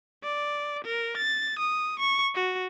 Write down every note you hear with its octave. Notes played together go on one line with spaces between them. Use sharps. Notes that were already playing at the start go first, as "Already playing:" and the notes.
D5
A#4
A6
D#6
C#6
F#4